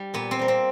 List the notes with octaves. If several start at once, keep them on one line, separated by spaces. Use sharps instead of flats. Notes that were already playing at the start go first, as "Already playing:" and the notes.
Already playing: G3
A#2 B3
C4
G3 A#3
C4